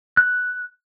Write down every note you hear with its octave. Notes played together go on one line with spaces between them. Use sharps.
F#6